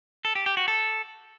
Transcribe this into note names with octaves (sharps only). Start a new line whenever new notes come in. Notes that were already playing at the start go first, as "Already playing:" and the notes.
A4
G4
G4
F#4
A4